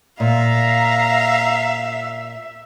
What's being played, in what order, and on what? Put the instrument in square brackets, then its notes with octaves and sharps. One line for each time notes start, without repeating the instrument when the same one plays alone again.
[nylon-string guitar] A#2 [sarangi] E5 [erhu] F5 [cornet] A#5